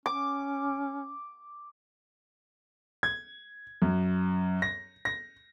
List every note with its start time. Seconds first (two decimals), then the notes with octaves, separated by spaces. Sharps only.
0.06 C#4 D6
3.03 G#6
3.82 F#2
4.62 A#6
5.05 A#6